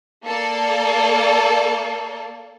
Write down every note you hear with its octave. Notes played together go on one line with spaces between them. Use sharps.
A#3 A4 D5